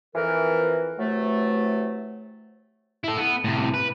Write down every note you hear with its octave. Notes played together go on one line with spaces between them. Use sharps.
F2 E3 A#4
C3 E3 F#3 A3
E4 A4
B3
A2 C3
B4